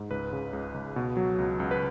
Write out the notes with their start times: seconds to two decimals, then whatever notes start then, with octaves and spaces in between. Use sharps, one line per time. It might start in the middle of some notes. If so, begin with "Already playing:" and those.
Already playing: G#2
0.11 C#2 B4
0.33 C#3
0.53 C#2
0.74 C#2
0.96 B2
1.17 F#3
1.38 C#2
1.60 C#2
1.71 B4